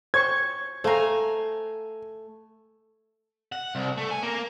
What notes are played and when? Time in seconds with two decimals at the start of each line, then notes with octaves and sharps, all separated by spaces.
0.14 C5 C#5 C#6 G#6
0.84 A3 C5 F5 G#5 A#5
3.52 F#5
3.75 C2
3.97 A3
4.11 G#5
4.22 A#3